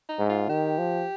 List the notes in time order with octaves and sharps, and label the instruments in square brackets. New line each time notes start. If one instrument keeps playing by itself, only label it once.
[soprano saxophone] D#4
[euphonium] G#2
[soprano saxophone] F4
[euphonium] D#3 [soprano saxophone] G4
[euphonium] F3